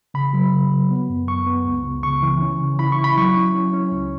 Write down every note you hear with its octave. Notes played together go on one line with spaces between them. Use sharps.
C#3 B5
F#3
C#3
F#3
B3
F#2
F#2 C#6
B3
C#2
C#2
C#3 C#6
E3
C#4
C#3
E4 B5
C#6
E4
B5
F#3 C#6
C#4
C#4
C#4
C#2